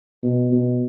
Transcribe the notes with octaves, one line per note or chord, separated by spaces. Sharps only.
B2
B2